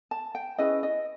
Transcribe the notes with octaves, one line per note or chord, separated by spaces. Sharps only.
A5
G5
C#4 E4 G#4 B4 D#5
D#5